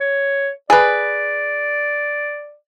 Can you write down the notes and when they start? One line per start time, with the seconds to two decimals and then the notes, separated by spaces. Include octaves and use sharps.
0.01 C#5
0.70 G#4 B4 D5